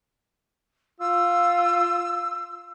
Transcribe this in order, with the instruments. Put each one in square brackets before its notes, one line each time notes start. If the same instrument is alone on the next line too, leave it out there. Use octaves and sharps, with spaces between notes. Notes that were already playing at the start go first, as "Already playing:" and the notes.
[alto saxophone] F4 [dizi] E6